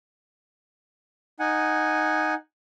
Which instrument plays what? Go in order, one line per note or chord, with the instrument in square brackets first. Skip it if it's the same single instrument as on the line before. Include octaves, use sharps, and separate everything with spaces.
[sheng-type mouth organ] D#4 F#5 G#5